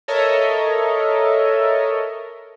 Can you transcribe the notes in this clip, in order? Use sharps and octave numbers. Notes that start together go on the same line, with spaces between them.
A4 A#4 C#5 D#5 E5